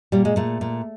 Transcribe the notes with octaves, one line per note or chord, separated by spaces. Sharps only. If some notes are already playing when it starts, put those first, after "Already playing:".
A#2 G3
G#3
A#2 A3
A#2